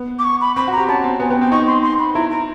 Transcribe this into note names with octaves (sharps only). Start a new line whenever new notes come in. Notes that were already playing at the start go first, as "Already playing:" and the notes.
Already playing: B3
D6
C#6
B5
C4 B5
F#4
A#5
G4
C#4 A5
C4
B3 G#5
B3 G5
C4 G5
D#4 C#6
C6
C6
B5
E4 A#5
A#5